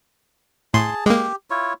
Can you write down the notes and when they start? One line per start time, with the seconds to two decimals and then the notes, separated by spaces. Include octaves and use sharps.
0.74 A2 G#4 A5 C6
1.06 G#3 A#3 G4
1.50 E4 F4 C#5